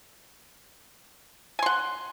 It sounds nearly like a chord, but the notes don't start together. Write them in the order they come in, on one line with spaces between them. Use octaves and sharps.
G#5 C6 F#5